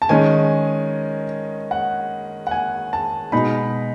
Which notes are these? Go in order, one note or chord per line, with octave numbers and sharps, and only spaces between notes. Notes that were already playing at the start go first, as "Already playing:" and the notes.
A5
D#3 G#3 C#4 G#5
F#5
F#5
G#5
A5
B2 G#3 D#4 B5